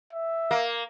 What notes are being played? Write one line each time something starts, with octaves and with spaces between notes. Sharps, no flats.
E5
A#3